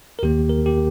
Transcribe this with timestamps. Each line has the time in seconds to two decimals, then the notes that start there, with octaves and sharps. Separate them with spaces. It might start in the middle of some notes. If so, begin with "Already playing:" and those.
0.19 A#4
0.23 D#2 D#3 A#3 G4
0.50 A#4
0.66 G4